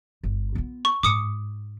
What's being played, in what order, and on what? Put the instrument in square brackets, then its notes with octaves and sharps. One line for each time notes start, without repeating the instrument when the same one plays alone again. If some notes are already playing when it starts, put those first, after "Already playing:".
[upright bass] G1
B3 F4
[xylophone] C#6
[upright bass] G#2 [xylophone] D6 D#6 C#7